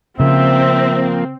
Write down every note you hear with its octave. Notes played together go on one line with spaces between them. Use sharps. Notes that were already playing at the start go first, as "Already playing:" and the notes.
C#3 F3 A#3 C4 E5